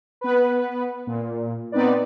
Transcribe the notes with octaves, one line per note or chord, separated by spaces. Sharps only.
B3 B4
A#2
B3 C4 D#4 B4 D5